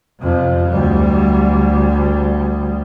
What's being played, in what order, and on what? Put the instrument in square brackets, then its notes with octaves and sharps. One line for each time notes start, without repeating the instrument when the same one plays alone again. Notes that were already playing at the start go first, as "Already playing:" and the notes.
[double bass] F2 C3
D2 G3